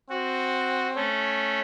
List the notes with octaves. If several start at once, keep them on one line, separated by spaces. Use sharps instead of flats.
C4 F#4
A3 C#4